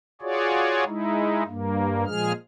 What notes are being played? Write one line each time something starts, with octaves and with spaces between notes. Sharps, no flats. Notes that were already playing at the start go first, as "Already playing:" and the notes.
F4 F#4 G#4 C#5 D5
G#3 D#4 E4
G2 A#3
A#2 F3 G#3 G#4 F6